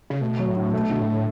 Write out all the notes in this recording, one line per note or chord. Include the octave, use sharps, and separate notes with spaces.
C#3
B2 A3
F#3
A2
D3
B2 A3
B2 D3
A2